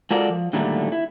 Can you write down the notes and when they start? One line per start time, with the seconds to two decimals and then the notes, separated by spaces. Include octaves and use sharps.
0.11 G#3 F4 F#4 A4 A#4 D5
0.29 F3
0.53 A#2 D3 D#3 F#3 G3 A3
0.92 E4